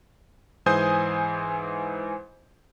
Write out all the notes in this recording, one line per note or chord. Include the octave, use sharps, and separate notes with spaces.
G#2 E3 C5 G#5 D#6 G6